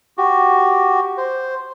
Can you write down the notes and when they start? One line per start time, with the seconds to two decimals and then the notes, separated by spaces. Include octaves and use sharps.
0.18 F#4 G4
1.18 C5